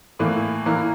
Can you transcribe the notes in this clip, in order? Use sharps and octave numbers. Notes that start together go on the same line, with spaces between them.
A2 E3 A#3
E3 A#3 E4 A#4